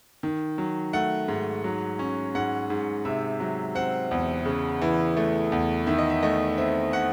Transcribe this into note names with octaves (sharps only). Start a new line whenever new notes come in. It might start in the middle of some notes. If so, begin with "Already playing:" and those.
D#3
F#3
A3 F#5
G#2
F#3
C#4
G#2 F#5
G#2
C3 E5
F#3
C4 F#5
E2
C#3
E3
A3
E2
D#3 E5
D#5
E5
A3 D#5
C4 E5
F#5